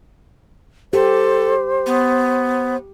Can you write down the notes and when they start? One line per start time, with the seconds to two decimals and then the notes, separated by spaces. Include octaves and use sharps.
0.93 G4 A4 C5
1.86 B3